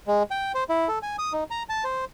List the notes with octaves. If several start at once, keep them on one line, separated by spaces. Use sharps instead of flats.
G#3
G5
C5
E4
A4
G#5
D#6
D#4
A#5
A5
C5